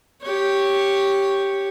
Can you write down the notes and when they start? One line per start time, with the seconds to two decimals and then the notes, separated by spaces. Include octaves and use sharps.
0.22 G4 C#5